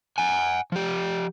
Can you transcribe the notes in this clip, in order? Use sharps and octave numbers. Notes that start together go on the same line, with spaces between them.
F#5 G#5
F3 G4